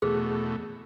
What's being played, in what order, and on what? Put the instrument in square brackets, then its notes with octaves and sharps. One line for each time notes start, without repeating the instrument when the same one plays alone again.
[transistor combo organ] E2 B2 A3 [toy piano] G#4